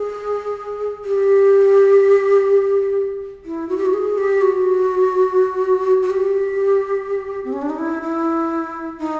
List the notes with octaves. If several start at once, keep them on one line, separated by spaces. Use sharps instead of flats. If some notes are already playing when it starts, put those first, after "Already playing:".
Already playing: G#4
G4
E4
F#4
G4
F#4
G#4
G4
F#4
F#4
G4
C4
C#4
D4
D#4
E4
E4
D#4